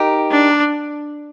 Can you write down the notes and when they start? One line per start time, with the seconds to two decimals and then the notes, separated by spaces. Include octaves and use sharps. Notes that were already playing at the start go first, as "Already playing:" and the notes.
Already playing: D#4 G4 A#4
0.31 D4